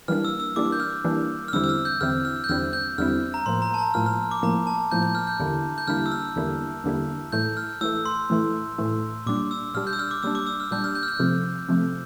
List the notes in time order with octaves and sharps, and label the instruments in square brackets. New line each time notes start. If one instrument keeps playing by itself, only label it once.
[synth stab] E3 G3 A#3 D4 [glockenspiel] F6
[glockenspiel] E6
E6
[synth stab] E3 G3 A#3 D4 [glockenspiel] D6
[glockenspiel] G6
F6
[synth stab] E3 G3 A#3 D4
[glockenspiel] F6
[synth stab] E2 D3 G3 C4 E4 [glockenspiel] E6
[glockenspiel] E6
F6
G6
[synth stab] E2 D3 G3 C4 E4 [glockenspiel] F6
[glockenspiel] F6
G6
[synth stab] E2 D3 G3 C4 E4 [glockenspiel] F6
[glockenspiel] G6
[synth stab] E2 D3 G3 C4 E4 [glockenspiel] F6
[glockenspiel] A#5
[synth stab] A2 F3 A#3 [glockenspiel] C6
[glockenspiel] A#5
A5
A#5
[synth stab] A2 F3 A#3 [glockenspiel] F6
[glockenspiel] F6
D6
[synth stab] A2 F3 A#3 [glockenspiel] A#5
[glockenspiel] A5
[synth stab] A2 F3 A#3 [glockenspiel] G6
[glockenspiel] G6
F6
G6
[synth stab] E2 D3 G3 A#3 E4
[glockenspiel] G6
[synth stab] E2 D3 G3 A#3 E4 [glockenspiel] F6
[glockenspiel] E6
F6
[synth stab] E2 D3 G3 A#3 E4
E2 D3 G3 A#3 E4
[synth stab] A2 E3 A3 [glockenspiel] G6
[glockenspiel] F6
[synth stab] A2 E3 A3 [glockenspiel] E6
[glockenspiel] C6
[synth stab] A2 E3 A3
A2 E3 A3
[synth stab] A#2 G3 D4 [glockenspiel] D6
[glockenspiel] E6
[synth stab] A#2 G3 D4 [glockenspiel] F6
[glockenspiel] G6
E6
F6
D6
[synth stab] A#2 G3 D4 [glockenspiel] E6
[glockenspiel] D6
E6
F6
[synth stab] A#2 G3 D4 [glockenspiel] G6
[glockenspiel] F6
G6
F6
G6
[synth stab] C3 F3 A3
C3 F3 A3